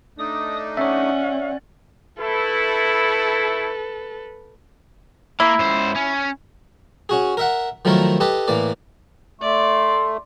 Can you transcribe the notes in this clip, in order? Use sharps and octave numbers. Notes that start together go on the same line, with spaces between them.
A3 D4 D#4 D#6
C#4 C#5 D5 E5 F#5
A3 E4 A4 B4
A#3 E4
C#2 C5
C#4
C#4 F#4 G#4
A#4 E5 F#5
D#3 F3 F#3 A3 E4 A#4
G4 A4 B4 D#5
A2 E3 A#3 D5
A3 D5 C6